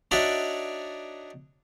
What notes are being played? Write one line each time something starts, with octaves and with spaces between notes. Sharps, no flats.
D4 D#4 F#4 C#5 D5 E5